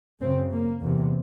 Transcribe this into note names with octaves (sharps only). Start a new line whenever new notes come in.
F#2 C#3 C4
A#3
E2 C3